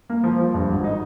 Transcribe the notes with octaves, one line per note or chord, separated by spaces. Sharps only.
A#3
F3
F3
G2
G#1
D#4